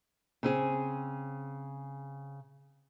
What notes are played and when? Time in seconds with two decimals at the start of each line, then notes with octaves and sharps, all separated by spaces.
0.43 C#3 C4 G#4